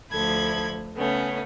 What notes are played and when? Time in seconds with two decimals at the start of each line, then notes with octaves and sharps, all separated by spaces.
0.12 D2 F3 A4 B5 G#6
0.96 C#3 A3 B3 C#4